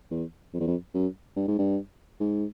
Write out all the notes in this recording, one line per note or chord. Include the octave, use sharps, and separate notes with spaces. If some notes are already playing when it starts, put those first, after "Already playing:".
E2
F2
E2
F2
F#2
G2
G#2
G2
G#2